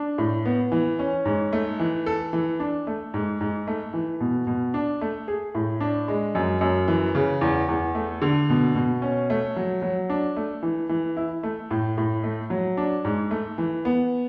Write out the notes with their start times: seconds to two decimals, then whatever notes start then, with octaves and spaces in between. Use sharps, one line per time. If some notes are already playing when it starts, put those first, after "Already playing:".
Already playing: D4
0.18 A2
0.46 B3
0.72 E3
0.99 C#4
1.25 G#2
1.53 A3
1.79 E3
2.06 A4
2.33 E3
2.60 D4
2.87 A3
3.14 G#2
3.41 G#2
3.67 A3
3.94 E3
4.20 B2
4.47 B2
4.74 D4
5.01 A3
5.28 G#4
5.55 A2
5.80 D4
6.08 G#3
6.35 F#2
6.61 F#2
6.88 E3
7.15 C#3
7.41 E2
7.69 E2
7.95 A3
8.22 D3
8.49 B2
8.75 B2
9.02 C#4
9.30 A3
9.56 F#3
9.82 F#3
10.10 D4
10.36 A3
10.63 E3
10.89 E3
11.17 E4
11.43 A3
11.71 A2
11.98 A2
12.24 A3
12.50 F#3
12.77 D4
13.05 G#2
13.31 A3
13.58 E3
13.85 B3